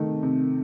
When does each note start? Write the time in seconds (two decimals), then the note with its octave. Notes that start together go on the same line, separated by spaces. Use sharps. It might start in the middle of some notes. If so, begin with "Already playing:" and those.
Already playing: C3 D#3 A3
0.23 C3